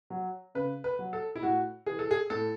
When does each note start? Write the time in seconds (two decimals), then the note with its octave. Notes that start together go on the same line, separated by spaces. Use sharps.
0.10 F#3
0.55 C#3 B4
0.84 B4
0.99 F#3
1.13 A4
1.36 E4
1.42 A2 F#4
1.86 E3 G#4
1.99 A4
2.11 G#4
2.30 A2 A4